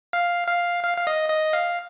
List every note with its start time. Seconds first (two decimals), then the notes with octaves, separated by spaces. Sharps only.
0.13 F5
0.47 F5
0.83 F5
0.97 F5
1.07 D#5
1.30 D#5
1.53 F5